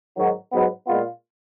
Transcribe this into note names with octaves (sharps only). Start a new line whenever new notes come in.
G#2 D#3 F#3
G#2 F#3 B3
A#2 G#3 B3 F4